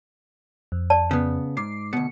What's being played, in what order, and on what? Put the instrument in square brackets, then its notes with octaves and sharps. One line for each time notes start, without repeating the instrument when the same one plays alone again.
[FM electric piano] F2
[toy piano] D5 A5
[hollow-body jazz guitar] C#3 B3
[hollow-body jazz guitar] G#2 [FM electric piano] D6 C7
[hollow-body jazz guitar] D2 B2 [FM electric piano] C#7